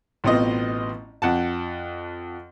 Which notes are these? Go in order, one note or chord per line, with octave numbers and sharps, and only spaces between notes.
A1 B2 B3 C4 F4 D#5
F2 F#5 A5